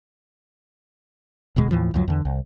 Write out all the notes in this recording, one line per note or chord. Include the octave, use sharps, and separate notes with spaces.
E1 D2 B2 G#3
D#2 A2 E3 F3
C#2 F#2 F3 F#3
E2 D3
C2